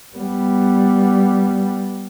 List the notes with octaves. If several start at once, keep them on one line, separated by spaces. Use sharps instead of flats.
G3 B3